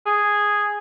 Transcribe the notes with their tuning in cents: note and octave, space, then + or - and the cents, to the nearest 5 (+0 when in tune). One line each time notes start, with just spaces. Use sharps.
G#4 -5